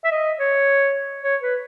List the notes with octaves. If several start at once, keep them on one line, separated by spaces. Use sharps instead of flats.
E5
D#5
C#5
C#5
B4